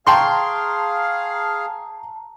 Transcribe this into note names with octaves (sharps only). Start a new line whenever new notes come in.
G#4 F5 G5 A5 A#5 C6 C#6